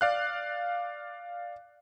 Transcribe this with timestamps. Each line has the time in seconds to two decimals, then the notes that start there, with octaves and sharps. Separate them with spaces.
0.01 D5 F5 F#6